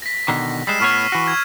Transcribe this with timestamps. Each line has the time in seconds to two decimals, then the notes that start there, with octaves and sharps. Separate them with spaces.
0.02 A#6 B6
0.28 B2 D3 D#3
0.67 G3 G#3 E6 C7 E7
0.80 A2 B3 C#5 C#6 F6
1.12 E3 F#4
1.28 G#6